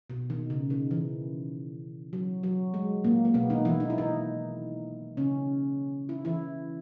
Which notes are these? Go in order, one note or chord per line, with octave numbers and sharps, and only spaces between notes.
B2
D#3
C#3
D#3
E3
F#3
F#3
G#3
A#2 A#3
A#3
B2 B3
D#3 D#4
E3 E4
D#4
E4
D#3 D#4
C#3 C#4
E4
E3 E4